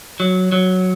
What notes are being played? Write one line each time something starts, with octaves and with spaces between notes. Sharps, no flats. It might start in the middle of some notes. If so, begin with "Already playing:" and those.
F#3
F#3